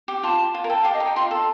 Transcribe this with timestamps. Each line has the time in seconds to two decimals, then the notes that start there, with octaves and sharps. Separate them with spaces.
0.08 G4
0.23 F4 A5
0.54 F4
0.64 A#4
0.69 A4 G5
0.81 F5
0.85 G4
0.93 D#5
1.00 D#4 G5
1.16 F4 C6
1.31 A4